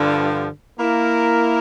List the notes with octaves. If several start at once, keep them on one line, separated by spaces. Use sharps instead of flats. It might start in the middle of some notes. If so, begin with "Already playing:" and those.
Already playing: G2 D3 F3
A#3 E4 A#4